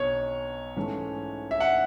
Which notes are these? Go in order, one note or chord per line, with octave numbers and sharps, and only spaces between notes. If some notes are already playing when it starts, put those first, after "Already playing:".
Already playing: B1 B2 F#3 C#5
G#2 E3 A3 C#4
E5
F#5